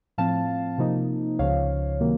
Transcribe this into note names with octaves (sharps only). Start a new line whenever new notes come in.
A2 F3 C4 F5 A5
C3 F3 A#3 D#4
C#2 C#3 F3 C#5 F5
C3 D#3 F#3 A#3